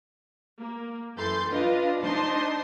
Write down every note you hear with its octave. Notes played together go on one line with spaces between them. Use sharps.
A#3
F#2 E3 A4 C6 G6 A6
D4 F4 B4 D#5 F5
D4 D#4 C5 D#5 A5 C6